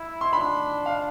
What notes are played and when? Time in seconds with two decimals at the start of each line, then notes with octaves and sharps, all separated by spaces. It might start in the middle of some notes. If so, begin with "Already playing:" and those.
Already playing: E4
0.21 C6
0.33 D4 B5
0.86 F5